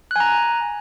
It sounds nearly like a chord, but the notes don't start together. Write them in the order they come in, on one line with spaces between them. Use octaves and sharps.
F#6 G#5 A#5